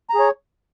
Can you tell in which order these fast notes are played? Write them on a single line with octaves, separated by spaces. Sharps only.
A#5 G#4 C#5